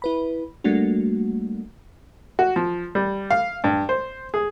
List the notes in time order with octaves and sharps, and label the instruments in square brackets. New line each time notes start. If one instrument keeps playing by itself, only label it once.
[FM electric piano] E4 B4 B5
G3 A3 A#3 D4 F#4
[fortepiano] F#4
F3
G3
F5
G2
C5
G#4